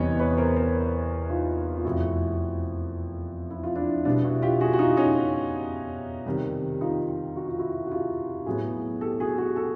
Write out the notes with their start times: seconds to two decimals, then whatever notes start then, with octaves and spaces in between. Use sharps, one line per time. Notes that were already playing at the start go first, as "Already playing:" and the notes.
Already playing: E2 C3 E3 G3 B3 C#5 D#5
0.19 B4 C#5
0.37 A#4 C5
0.56 A#4 C5
1.30 D#4 F4
1.76 F4
1.85 F2 C3 F3 A3 E4 F#4
3.50 E4
3.64 F4
3.76 D4 E4
4.05 B2 G3 B3 D4
4.24 E4 F#4
4.42 F4 G4
4.61 F#4 G#4
4.73 F#4
4.79 D#4 F4
4.97 C#4 D#4
6.26 C3 D#3 G3
6.81 D#4 F4
7.36 F#4
7.47 F4
7.59 E4 F#4
7.86 F#4
7.91 F4 G4
8.46 A2 F#3 B3 F#4 G#4
9.01 G4 A4
9.20 F#4 G#4
9.38 F#4 G#4
9.56 G4 A4